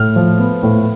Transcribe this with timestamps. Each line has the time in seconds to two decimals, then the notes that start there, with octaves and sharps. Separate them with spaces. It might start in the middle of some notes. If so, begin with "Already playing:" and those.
Already playing: A2 F6
0.16 F3
0.39 B3
0.63 A2